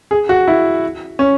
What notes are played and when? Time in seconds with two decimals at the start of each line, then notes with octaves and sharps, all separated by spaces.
0.11 G#4
0.29 F#4
0.48 E4
1.19 C#4